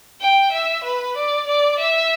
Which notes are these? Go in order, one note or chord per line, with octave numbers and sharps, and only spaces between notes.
G5
E5
B4
D5
D5
E5